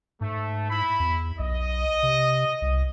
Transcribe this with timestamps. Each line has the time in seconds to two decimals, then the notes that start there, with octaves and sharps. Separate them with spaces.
0.21 G#2 A3
0.69 E4 B5
1.00 E2
1.39 B1 D#5
2.03 C3
2.62 C2